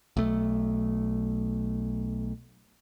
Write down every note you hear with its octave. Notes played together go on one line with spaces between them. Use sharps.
B1 A3